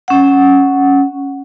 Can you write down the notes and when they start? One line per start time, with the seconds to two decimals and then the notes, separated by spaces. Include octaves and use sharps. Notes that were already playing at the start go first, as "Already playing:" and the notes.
0.08 C#4 F#5